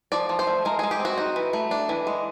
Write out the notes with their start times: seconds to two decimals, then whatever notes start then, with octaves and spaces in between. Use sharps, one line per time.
0.12 F3 D5
0.29 F3
0.39 C5
0.47 A3
0.65 G#3 A#4
0.79 G#3 G#4
0.91 G4
1.00 C4 F#4
1.18 D#4
1.36 E3
1.53 A3
1.71 D4
1.89 E3
2.07 G#3